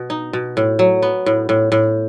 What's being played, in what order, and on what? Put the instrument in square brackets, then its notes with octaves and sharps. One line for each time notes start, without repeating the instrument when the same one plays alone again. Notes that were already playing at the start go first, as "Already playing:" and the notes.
Already playing: [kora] B2
D#4
B2
A2
F#3
B3
A2
A2
A2